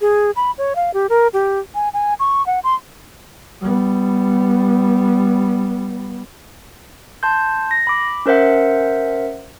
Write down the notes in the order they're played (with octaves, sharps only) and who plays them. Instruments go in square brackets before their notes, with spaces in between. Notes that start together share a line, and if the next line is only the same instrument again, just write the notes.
[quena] G#4
B5
C#5
F5
G4
A#4
G4
G#5
G#5
C#6
F#5
C6
[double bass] G3 B3
[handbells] A5 C6 G6
A#6
B5 D6
C#4 A#4 C5 E5 F#5